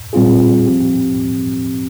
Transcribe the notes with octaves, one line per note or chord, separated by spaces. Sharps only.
A#2 G3 C4 F4 G#4
F3 C4 G4